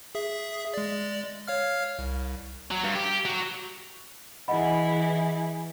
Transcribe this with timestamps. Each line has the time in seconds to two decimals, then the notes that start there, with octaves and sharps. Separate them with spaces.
0.15 G#4 E5
0.74 G#3 D5
1.48 C#5 F5 F6
1.99 C2
2.71 F#3
2.84 G2
2.95 G4
3.25 F#3
4.48 E3 E4 G#4 D#5 F#5 B5